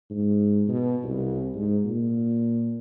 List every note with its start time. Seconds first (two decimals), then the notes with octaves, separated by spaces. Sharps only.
0.10 G#2
0.68 B2
1.03 C2
1.54 G#2
1.84 A#2